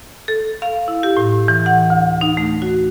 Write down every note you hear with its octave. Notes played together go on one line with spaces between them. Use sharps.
A4
F5
E4
G4
A2
E3
F#5
D2
D#4
A3
F#4